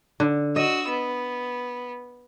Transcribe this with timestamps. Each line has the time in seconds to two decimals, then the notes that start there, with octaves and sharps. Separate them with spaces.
0.20 D3
0.56 F#4 D#5 E6
0.89 B3